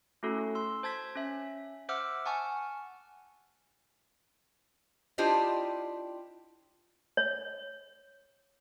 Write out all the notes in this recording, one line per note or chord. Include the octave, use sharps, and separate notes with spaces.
A3 C#4 E4 F#4 A4
C6 E6
C5 A5 G#6 B6
C#4 E5
C5 E5 F#5 D6 E6 F6
F#5 G#5 A5 C#6 F6
D4 E4 F4 G4 C5 D#5
C#5